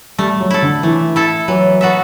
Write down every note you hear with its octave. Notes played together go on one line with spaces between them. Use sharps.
G3 A3
F#3
E4 A4
D3
E3 A3
E4 A4
E3 F#3
B3 F#4 A4 E5